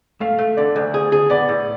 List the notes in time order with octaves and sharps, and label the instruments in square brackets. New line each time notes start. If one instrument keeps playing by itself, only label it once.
[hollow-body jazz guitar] A3 [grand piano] F5
[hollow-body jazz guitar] A3
[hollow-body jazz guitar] D3 [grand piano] D5
[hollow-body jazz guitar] D2
G#4
G#4
[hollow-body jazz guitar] B3 [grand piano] D5
[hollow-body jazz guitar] A2